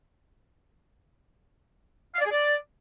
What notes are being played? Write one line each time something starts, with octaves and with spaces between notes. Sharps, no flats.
F5
D5
G#4
D5